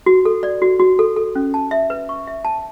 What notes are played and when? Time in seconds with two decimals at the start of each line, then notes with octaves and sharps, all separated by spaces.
0.06 F#4
0.25 A4
0.43 D5
0.62 F#4
0.79 F#4
0.99 A4
1.16 A4
1.35 C#4
1.54 A5
1.71 E5
1.90 B4
2.09 C#6
2.27 E5
2.45 A5